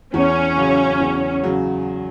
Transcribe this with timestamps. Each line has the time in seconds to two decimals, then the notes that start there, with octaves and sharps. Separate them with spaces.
0.14 E2 C#4
0.57 C#3 F#3
1.00 E2
1.44 C#3 F#3